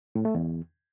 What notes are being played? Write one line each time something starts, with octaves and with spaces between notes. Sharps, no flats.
A2
A3
E2